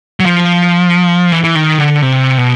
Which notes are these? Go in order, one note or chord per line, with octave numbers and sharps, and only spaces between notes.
F#3
F3
E3
E3
D#3
D3
C3
B2